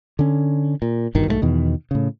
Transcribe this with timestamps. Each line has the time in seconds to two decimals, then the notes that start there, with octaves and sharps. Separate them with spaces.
0.19 D3 C#4
0.82 A#2
1.15 G1 G2 B2 D#3
1.27 B1 G#2 F3 A3
1.42 E2 B2 D#3
1.91 A2 C#3